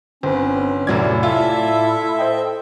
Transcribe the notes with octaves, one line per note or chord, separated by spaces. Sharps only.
G1 C4 C#4 B4
F1 A2 F#3 E4 D5 G#6
F4 A4 E5
C5 D#5 G5